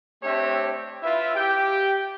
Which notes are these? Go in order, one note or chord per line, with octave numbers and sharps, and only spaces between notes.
A3 C4 D4 G4 C#5 E5
E4 F4 B4 E5
G4 G5